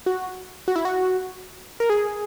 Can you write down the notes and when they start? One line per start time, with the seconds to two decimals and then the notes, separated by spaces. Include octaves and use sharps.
0.06 F#4
0.68 F#4
0.76 E4
0.85 F#4
1.80 A#4
1.90 G#4